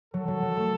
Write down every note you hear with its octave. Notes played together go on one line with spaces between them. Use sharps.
F#3 A4
F#3
F#3
A3